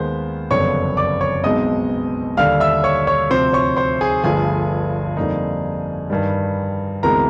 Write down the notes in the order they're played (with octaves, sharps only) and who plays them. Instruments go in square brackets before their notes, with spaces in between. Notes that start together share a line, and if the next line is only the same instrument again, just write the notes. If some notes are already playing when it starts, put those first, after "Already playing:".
Already playing: [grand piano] D#2 D#3 G#3 B3 C5
F#1 F2 D3 G3 B3 C#5 C#6
D5 D6
C#5 C#6
B1 B2 G#3 C4 D#4 D#5 D#6
D#2 D3 G3 F5 F6
E5 E6
C#5 C#6
C#5 C#6
D2 C3 F3 C5 C6
C#5 C#6
C5 C6
G#4 G#5
G1 G2 D3 F3 A3 G#4 G#5
F2 D3 G3 A#3 D#4
G2 D#3 G3
D2 C3 E3 G#3 B3 A#4 A#5